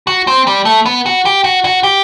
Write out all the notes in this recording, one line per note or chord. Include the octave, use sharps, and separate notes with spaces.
F#4
C4
G3
A3
B3
F#4
G4
F#4
F#4
G4